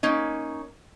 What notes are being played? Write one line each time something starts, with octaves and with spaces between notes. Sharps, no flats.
A#3 C#4 D#4